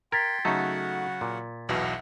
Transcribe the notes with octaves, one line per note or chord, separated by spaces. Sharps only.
A#4 G5 C6 G#6 A6 B6
C#3 F#3 A3 D#4 F#4 A4 F#5
A#2
B1 E2 B2 E5 F#5